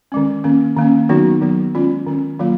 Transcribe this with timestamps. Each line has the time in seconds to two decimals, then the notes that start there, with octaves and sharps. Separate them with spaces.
0.12 D#3 G#3 C#4
0.44 D#3 A#3 C#4
0.77 D#3 A#3 C#4
1.09 D#3 F#3 B3 D#4 F#4
1.41 D#3 F#3 B3
1.75 D#3 G#3 C#4 F4
2.07 D#3 G#3 C#4
2.39 D#3 F#3 A#3 F4